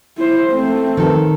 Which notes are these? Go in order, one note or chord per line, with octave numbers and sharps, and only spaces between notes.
E4 C5
A3 C4
D#3 A4